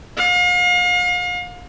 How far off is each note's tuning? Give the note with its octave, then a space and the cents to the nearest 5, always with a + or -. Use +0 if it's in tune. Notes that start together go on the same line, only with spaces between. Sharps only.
F5 +40